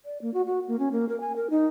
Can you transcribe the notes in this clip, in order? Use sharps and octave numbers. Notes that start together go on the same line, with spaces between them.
D5
A#3
F#4
F#4
A#3
C#4
A#3
A#4
G#5
A#4
D#4